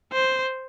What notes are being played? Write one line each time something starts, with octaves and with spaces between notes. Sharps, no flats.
C5